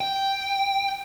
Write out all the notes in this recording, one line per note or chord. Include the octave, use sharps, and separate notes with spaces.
G5